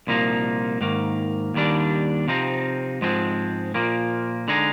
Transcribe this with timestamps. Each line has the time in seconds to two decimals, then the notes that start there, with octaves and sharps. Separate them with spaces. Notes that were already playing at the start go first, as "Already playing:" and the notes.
0.07 C2 A#2 F3 A#3 D#4
0.81 G#2 D#3 A#3
1.54 D#2 D#3 G3 D4
2.28 C3 F3 C4 D#4
3.01 G#2 F3 G#3 C4
3.74 A#2 F3 A#3
4.48 D3 G#3 D#4